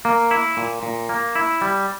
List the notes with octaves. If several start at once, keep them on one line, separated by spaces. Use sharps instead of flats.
A#3
E4
A#2
A#2
A#3
E4
G3